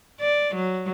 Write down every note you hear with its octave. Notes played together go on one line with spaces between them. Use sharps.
D5
F#3